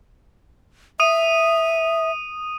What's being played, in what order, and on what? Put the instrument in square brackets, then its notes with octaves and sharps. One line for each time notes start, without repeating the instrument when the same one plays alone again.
[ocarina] E5 [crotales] D#6 D#7